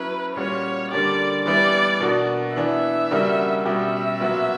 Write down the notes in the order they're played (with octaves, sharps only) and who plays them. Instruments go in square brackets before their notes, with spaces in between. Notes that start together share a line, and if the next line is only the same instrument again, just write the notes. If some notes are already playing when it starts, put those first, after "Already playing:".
Already playing: [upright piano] F#3 C#4 E4 [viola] B4
[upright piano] A#2 G3 C#4 F#4 [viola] C#5
[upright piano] D3 G3 A#3 D4 G4 [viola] D5
[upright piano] E3 G3 B3 E4 [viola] D5
[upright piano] B2 A#3 D4 F#4
[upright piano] E3 B3 D4 [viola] E5
[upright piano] C#3 G3 A#3 D4 F#4
[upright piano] B2 G3 C#4 G4 [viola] E5
[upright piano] A#2 F#3 B3 F#4